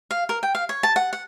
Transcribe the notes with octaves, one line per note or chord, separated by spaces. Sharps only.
F5
A#4
G5
F5
C#5
A5
F#5
F#5